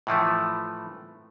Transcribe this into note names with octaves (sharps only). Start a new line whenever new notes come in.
A2 E3 F3 A3